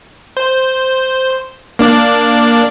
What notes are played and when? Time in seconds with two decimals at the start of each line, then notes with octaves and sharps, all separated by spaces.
0.37 C5
1.79 A#3 D4 D5